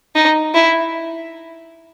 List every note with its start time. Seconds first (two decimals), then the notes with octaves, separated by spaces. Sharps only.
0.15 D#4
0.54 E4